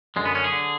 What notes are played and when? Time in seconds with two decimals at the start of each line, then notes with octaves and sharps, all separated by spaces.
0.16 F#2 D3 G#3
0.25 B3
0.35 C#4
0.44 G#4
0.52 D3